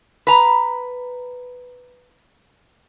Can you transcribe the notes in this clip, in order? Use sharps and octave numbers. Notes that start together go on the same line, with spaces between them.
B4 A#5